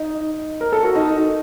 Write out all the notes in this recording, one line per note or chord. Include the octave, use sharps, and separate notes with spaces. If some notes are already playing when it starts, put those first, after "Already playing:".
Already playing: D#4
A#4
A4
F#4
D#4